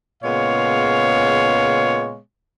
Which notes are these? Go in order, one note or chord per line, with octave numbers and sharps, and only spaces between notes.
A#2 C#3 G#3 B3 C#5 F5